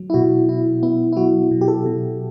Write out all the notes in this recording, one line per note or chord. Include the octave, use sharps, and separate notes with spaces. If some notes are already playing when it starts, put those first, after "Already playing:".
Already playing: F#3
E4
B2 F#4
B2 E4
B3 E4
E4
F#3 F#4
B2
G4
A4
B2